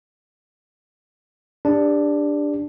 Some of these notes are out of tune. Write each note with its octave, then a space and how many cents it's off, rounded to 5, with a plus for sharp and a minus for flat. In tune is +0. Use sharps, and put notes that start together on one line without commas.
D4 +0 G4 +35